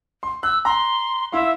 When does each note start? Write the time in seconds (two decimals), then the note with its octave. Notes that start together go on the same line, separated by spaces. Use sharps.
0.23 C6
0.43 E6 F#6
0.65 A#5 C6
1.32 E4 E5 F5 C6